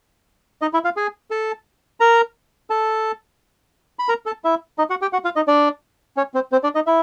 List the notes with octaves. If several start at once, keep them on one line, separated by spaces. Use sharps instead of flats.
D#4 D#5
E4 E5
F4 F5
G#4 G#5
A4 A5
A#4 A#5
A4 A5
B5
A#4 A#5
A4 A5
E4 E5
D#4 D#5
F#4 F#5
G4 G5
F#4 F#5
F4 F5
D#4 D#5
D4 D5
C#4 C#5
C4 C5
C4 C5
D4 D5
D#4 D#5
E4 E5